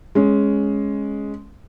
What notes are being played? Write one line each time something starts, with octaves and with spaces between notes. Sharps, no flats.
G#3 C#4